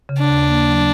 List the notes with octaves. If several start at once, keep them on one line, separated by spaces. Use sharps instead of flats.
C#3
D4
D#2
A#3
F#3